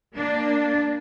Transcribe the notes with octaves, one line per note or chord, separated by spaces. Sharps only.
A#3 D4